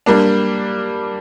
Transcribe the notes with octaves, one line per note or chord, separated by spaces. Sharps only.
G3 A#3 D4